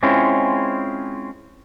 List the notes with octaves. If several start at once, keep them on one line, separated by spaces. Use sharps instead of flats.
G#3 C4 C#4 E4 F4